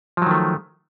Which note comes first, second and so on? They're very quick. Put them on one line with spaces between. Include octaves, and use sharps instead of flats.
F3 F#3 D#3 A3